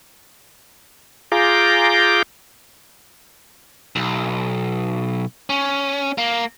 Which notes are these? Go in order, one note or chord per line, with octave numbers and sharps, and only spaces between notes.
F4 G#4 A#5 D6 G6
B1
C#4
A#3